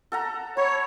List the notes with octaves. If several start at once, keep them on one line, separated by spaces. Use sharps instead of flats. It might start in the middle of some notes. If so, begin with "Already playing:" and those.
A4 F#5 A#5
C#5 B5